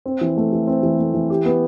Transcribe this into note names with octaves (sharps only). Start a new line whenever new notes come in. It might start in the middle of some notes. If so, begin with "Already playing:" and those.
C4
E3
A3
E3
C4
E3
A3
E3
G4
B3